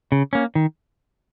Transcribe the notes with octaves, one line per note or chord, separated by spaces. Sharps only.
C#3
A#3 C#4
D#3